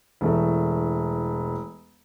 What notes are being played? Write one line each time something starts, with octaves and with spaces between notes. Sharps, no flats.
E1 A3